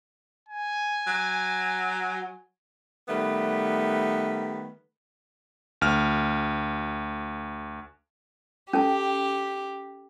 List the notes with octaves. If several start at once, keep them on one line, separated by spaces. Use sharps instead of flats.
G#5
F#3
D#3 G3 A3 B3 B4
D2 F6
C#4 G4 A4 A5